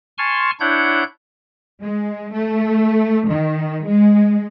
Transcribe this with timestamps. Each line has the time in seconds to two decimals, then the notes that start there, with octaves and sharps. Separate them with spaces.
0.18 G#5 A5 C6 C#6 F6
0.60 D4 E4 C#5 F#5 G6
1.82 G#3
2.36 A3
3.30 D#3
3.87 G#3